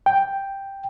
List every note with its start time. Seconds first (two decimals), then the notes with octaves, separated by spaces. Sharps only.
0.06 G5